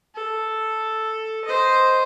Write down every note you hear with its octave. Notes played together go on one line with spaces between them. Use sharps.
A4
C5 D#5